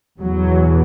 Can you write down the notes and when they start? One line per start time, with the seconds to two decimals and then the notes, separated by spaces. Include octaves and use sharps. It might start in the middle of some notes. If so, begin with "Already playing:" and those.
0.20 E2 B2 F#3